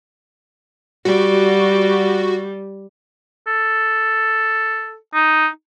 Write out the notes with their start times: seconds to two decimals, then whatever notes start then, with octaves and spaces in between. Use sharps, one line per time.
1.05 G3 F#4
3.47 A4
5.14 D#4